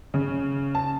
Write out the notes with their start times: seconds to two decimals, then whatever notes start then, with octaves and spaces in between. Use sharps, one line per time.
0.14 C#3
0.75 A5